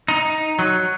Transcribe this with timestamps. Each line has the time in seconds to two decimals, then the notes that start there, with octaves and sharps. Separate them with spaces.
0.08 D#4
0.59 F#3